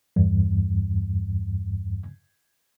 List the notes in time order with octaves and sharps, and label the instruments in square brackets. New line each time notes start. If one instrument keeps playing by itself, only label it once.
[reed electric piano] E2 G2